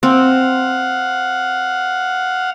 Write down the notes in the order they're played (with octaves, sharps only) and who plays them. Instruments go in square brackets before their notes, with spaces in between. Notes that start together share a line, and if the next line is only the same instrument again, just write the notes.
[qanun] C4 [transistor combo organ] F5 F#5